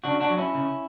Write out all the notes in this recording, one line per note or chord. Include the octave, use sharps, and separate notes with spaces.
C#3 D4 F#4
D4 F#4
F#3
C#4 E4
C#3